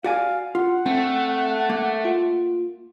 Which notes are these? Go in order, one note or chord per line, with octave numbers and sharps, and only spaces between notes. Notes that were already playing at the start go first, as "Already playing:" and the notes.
F#4 D5 F5 G#5
F4 F#5
A3 C4
A#3
F4